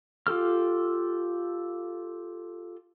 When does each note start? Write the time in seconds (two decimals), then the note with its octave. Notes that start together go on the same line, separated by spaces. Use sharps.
0.27 F4 G4 A4 F6